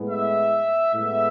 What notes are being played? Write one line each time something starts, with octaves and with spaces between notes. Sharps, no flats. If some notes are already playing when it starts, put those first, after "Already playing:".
Already playing: A2 G#3 B3
E5
A2 G#3 B3 E5